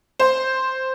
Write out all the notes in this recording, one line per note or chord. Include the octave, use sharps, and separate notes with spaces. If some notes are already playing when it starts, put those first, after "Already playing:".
C5